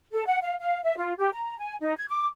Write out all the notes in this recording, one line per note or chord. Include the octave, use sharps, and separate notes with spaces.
A4
F#5
F5
F5
E5
F4
G4
A#5
G#5
D#4
G#6
D6